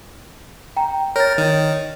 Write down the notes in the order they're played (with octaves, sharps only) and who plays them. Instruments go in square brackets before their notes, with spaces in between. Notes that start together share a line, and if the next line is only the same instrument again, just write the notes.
[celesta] G5 A#5
[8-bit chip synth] A#4 [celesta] C#5 A6
[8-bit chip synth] D#3